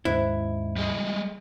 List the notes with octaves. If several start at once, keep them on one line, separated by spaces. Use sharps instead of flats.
D#2 G#2 C#3 E4 C5
G3 G#3 D#5